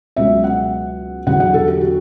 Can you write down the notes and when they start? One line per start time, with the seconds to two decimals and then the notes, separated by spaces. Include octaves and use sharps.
0.16 C#2 B2 F#3 E5
0.44 F#5
1.26 E2 D3 F#3 F#5
1.40 F#5
1.54 A4
1.68 G4
1.81 F#4